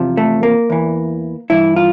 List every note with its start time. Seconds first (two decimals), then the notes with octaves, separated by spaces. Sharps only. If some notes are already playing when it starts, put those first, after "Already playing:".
Already playing: E2 C3 F3
0.17 A3
0.43 A#3
0.70 E2 E3
1.50 G2 E3 E4
1.76 F4